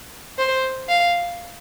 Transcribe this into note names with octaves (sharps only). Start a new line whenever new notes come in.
C5
F5